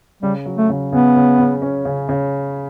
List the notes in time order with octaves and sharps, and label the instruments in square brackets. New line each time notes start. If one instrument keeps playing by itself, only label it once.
[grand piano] C#3 [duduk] G3
[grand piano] F#3
[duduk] A3
[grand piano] C#3
[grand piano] C#3 [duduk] B3
[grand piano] C#3
C#3
C#4
C#3
C#3